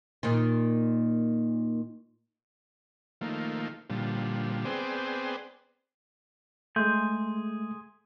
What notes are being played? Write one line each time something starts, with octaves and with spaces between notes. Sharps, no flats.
A#2 D#3
D#3 F3 A3 A#3
A#2 D3 F3 G3
B3 C4 G#4 C5 D5 G5
G#3 A3 G#4 C6 G6